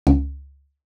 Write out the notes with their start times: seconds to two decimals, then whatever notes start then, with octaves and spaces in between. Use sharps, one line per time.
0.07 C#2